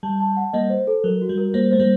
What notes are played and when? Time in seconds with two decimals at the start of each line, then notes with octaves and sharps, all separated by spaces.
0.03 G3 A5
0.20 A5
0.37 F#5
0.53 G3 A#3 D#5
0.70 C5
0.87 A4
1.04 F#3 A#4
1.21 F#4
1.29 G3
1.38 A#4
1.54 G3 A#3 C5
1.71 A3 C5
1.80 G3 A#3